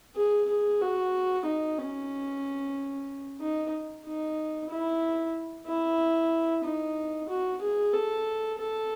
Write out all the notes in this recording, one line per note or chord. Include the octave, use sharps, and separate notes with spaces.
G#4
G#4
F#4
D#4
C#4
D#4
D#4
E4
E4
D#4
F#4
G#4
A4
A4